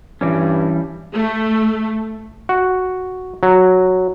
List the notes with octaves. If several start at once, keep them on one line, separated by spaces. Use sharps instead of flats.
G2 E3 G3 C#4
A3
F#4
F#3